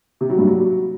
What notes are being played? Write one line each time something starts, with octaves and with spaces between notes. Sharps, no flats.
C3
F#3
G2
F#3